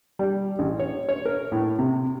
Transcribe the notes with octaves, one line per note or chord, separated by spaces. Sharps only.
G3
A1
C#5
C#5
A#4
A2
C3